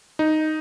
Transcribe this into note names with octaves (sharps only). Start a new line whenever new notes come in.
D#4